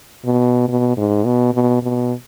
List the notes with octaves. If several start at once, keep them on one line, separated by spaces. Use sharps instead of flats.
B2
B2
G#2
B2
B2
B2